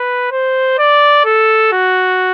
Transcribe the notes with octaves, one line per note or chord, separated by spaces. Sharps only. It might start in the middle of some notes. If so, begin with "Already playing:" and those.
Already playing: B4
C5
D5
A4
F#4